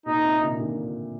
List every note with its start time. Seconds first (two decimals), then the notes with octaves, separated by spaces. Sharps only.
0.06 A#2 D#4
0.24 C3
0.41 A#2 D3
0.55 D#3
0.59 A#2 D3